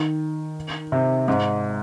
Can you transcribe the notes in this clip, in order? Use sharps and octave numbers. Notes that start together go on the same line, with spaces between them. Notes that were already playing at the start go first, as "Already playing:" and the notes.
Already playing: D#3
C3
G#2